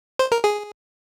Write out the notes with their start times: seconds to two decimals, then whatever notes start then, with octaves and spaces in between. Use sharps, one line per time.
0.19 C5
0.32 A#4
0.44 G#4